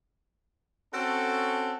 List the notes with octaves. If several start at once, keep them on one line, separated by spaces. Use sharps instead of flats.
C4 C#4 F#4 A4